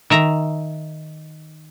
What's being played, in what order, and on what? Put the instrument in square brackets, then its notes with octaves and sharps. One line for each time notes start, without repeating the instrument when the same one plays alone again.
[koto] D#3 E5 A#5